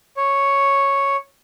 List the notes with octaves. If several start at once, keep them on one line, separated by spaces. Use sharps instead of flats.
C#5